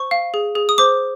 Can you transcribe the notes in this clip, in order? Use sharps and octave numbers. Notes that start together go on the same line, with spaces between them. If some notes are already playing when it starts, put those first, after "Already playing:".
Already playing: C5 C#6
F5
G#4
G#4
D#6
C5 D6